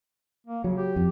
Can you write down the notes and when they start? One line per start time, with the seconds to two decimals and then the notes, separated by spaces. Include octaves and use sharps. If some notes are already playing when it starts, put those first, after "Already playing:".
0.47 A#3
0.64 C#3 F#3
0.77 G4
0.96 F2